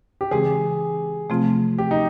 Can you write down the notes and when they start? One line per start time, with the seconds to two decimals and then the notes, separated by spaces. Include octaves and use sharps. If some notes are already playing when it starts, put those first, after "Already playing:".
0.21 G4
0.31 C#3 E3 G#3 C4 G#4
1.30 C3 F3 A3 C4 F4
1.78 G4
1.91 D#4